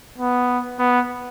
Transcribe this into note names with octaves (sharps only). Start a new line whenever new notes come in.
B3
B3